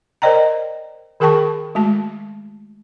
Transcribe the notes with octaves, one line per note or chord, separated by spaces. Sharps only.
A#4 C5 D5 D#5 G5 A#5
D#3 G#4 A#4 G5 A5 C#6
G#3 A3 F#4 A5